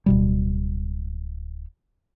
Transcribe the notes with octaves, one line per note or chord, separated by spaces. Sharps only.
D1 B2 G3